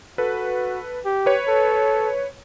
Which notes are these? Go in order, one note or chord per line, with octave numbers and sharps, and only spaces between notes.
F#4 A4 B4
G4
B4 C#5
A4